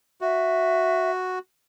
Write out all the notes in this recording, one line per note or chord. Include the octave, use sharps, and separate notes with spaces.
F#4 E5